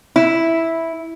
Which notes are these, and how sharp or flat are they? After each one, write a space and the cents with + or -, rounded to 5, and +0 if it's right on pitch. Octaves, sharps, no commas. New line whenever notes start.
E4 -5